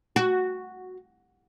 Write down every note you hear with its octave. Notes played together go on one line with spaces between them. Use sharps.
F#4